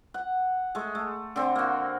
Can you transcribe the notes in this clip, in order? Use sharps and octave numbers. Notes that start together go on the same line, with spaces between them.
F#5
G#3 A3
A3
D3 C4
A#3 F#4